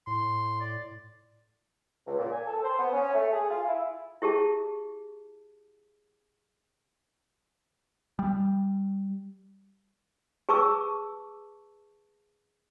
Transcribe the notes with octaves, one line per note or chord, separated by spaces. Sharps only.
A2 C6
D5
C#2
A#2
G#5
A4
C5
B3
C#4
A3
G#4
F4
E4
E4 G4 G#4 A5
G3
G#4 B4 A5 C#6 D6 E6